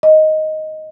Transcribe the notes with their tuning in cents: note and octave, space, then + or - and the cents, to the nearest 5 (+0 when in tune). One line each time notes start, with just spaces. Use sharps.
D#5 +5